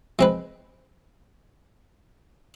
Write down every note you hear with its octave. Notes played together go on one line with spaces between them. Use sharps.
G#3 C4 B4